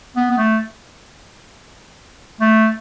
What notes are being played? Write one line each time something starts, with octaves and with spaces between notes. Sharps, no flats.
B3
B3
A3
A3